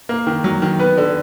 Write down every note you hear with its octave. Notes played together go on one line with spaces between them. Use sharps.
A#3
D#3
F#3
D#3
B3 B4
D3